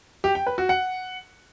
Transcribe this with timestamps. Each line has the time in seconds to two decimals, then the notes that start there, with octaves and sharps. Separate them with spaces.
0.24 G4
0.35 G5
0.47 B4
0.58 F#4
0.69 F#5